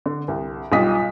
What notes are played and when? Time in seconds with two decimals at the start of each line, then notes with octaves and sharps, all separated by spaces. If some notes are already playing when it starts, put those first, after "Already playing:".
0.06 D3
0.28 C2
0.72 B1 G3 F4 D#5 D#6 B6